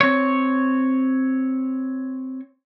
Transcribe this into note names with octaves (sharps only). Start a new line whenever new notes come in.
C4 C#5